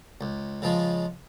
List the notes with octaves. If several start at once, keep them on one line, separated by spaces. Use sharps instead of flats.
C#2
C#3 F3 G#3